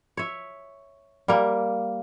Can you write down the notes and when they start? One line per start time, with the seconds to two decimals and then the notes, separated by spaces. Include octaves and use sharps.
0.17 C#5 E5
1.28 G3 A#3